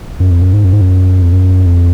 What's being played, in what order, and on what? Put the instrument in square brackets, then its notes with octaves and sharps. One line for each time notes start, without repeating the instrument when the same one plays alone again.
[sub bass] F#2
F2
F#2
G#2
F#2
G#2
F#2
F2
F#2
F2